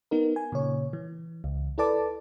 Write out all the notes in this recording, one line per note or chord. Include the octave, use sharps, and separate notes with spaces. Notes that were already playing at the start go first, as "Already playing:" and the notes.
B3 D#4 A#4
G#5
A#2 C#3 C#5
E3
C#2
E4 A4 B4 D5 A5 D6